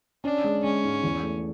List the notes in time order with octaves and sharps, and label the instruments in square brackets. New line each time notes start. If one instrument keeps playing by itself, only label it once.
[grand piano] C#4 [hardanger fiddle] D4
[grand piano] G#3
[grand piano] G#3 [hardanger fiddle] C#4
[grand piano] G#2
E2
A3